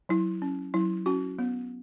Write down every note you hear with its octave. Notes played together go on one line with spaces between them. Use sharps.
F#3 E4
C#4
F#3 E4
C#4 F#4
B3